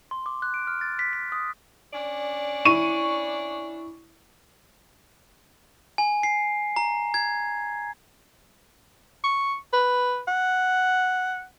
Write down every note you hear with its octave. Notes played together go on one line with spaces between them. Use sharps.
C6
D6
F#6
D7
F6
A6
B6
B6
D#6
C#4 D4 D5
E4 C#6 D#7
G#5
C7
A#5
G#6
C#6
B4
F#5